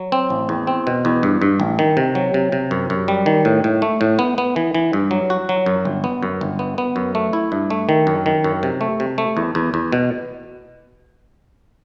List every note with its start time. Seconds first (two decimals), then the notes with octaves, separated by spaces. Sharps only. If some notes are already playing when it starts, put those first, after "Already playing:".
Already playing: F#3
0.12 C4
0.30 A1
0.49 E2
0.67 C4
0.87 B2
1.05 E2
1.23 G2
1.42 G2
1.60 A1
1.79 D#3
1.97 C3
2.15 F#3
2.34 C3
2.52 C3
2.71 F#2
2.90 F#2
3.08 G3
3.26 D#3
3.45 A2
3.64 A2
3.82 A3
4.01 A2
4.19 B3
4.38 B3
4.56 E3
4.74 E3
4.93 G2
5.11 F#3
5.30 F#4
5.49 F#3
5.66 F#2
5.85 G1
6.04 B3
6.23 F#2
6.41 G1
6.59 B3
6.78 B3
6.96 F#2
7.15 A3
7.33 E4
7.52 G2
7.70 A3
7.89 D#3
8.07 F#2
8.26 D#3
8.44 F#2
8.63 C3
8.81 A3
9.00 C3
9.18 A3
9.37 E2
9.55 E2
9.74 E2
9.92 B2